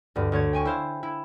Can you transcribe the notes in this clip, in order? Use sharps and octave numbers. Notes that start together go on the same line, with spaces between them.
D2 G2
D2 C#5 G#6
G5 G#5 C#6
E4 C5 F5
E4